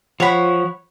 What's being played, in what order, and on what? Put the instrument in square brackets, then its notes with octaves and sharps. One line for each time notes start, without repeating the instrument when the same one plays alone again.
[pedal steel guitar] F3 [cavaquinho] C#5 F#5 B5